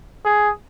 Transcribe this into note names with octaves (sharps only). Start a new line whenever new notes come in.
G#4